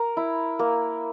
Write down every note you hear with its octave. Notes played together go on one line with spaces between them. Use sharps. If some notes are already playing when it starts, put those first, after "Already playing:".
Already playing: A#4
E4
A#3